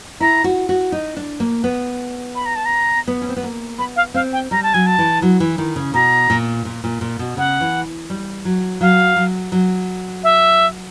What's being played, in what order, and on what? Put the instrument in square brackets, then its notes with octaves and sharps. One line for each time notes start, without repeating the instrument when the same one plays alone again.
[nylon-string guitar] E4 [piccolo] A#5
[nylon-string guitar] F#4
F#4
D#4
D4
A#3
B3
[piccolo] B5
A#5
A5
A#5
[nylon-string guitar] B3
C#4
C4
B3
A#3
[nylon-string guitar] B3 [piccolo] B5
[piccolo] F5
[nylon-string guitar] C4 [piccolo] F5
[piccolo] G5
[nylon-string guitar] G3 [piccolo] A#5
[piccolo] A5
[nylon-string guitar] F#3 [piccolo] G#5
[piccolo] A5
[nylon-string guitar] E3
F#3
E3
D#3
C#3
[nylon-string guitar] B2 [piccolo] A#5
[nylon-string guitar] A#2
A#2
A#2
A#2
B2
[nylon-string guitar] C#3 [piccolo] F#5
[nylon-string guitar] E3
G3
F#3
[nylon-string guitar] F#3 [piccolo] F5
[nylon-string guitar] F#3
F#3
[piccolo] E5